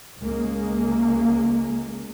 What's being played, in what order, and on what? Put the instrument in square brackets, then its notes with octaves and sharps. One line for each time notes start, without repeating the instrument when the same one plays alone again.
[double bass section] C#2 C#3 G#3 A#3